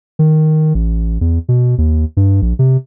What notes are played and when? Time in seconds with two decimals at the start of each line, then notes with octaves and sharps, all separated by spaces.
0.19 D#3
0.75 A1
1.21 E2
1.49 B2
1.78 D#2
2.17 G2
2.42 A#1
2.59 C3